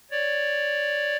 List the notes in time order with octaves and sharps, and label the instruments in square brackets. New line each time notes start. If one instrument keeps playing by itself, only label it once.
[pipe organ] C#5 D5